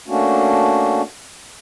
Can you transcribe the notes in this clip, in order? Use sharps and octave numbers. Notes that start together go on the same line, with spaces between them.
A3 A#3 C#4 D4 F#4